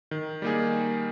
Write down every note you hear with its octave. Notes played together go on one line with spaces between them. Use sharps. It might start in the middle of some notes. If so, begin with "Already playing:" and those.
D#3
G3 A#3 D#4 G#4